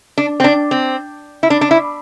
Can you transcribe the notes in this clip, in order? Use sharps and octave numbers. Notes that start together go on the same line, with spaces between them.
D4
C4
D4
C4
E4
D4
D4
E4